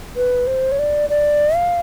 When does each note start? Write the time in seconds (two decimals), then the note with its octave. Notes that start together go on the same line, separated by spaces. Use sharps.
0.16 B4
0.47 C5
0.72 C#5
0.79 D5
1.10 D5
1.56 F5